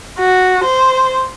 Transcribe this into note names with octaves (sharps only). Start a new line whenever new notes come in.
F#4
C5